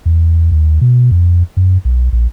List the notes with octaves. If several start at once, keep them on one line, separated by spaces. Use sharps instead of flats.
E2
D#2
B2
F2
F#2
B1
A#1